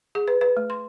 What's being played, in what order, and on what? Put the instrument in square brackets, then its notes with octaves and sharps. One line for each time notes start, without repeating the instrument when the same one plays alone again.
[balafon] G#4
B4
B4
A3
C6